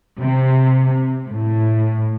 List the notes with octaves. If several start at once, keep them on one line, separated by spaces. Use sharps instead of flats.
C3
A2